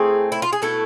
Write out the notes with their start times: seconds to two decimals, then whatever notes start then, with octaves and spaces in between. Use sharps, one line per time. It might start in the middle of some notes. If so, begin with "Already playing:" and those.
Already playing: A2 A3 C4 G#4
0.32 E4
0.42 F4
0.53 G#4
0.62 B2 A3 E4 A4